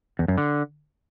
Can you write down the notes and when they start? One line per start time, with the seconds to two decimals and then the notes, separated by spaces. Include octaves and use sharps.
0.19 E2
0.28 F#2
0.38 D3